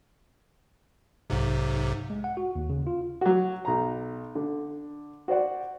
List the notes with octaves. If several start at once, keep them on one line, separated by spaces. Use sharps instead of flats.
B1 G#2 C3
G#3
F#5
F#4
D#2
C#3
F4
F#3 F#4
B1 A#5
D3
F#4 C5 D5 F#5